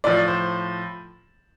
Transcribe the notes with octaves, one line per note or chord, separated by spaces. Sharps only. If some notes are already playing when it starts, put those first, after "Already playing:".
A2 F3 D5
C5